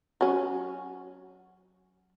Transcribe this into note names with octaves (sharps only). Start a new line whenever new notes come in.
F#3 C#4